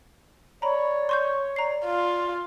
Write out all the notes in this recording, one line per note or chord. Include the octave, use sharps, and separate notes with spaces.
C#5 D5 A#5 B5
C6 C#6 G6
D5 A#5 C7
F4